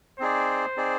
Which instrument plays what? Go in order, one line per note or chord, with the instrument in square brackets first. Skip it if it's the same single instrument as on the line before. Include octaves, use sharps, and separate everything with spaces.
[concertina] C4 D#4 G#4 D5 [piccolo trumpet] C5
[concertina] C4 D#4 G#4 D5